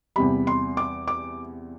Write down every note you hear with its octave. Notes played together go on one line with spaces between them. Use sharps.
E2 C3 G3 B5
C6
D6
D6